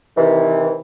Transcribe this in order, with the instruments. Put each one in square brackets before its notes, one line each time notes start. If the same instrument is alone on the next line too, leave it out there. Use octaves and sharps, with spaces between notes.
[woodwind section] C3 D#3 E3